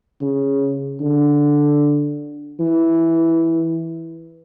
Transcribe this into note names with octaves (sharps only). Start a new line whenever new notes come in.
C#3
D3
E3